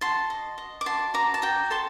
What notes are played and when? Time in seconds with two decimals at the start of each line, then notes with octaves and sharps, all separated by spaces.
0.01 F#4 A5 C6
0.30 D#5
0.58 D#5
0.81 D6
0.86 F#4 A5 C6
1.14 F#4 A#5 D6
1.34 A5
1.42 F#4 G5 A#5
1.70 A4 A5 C6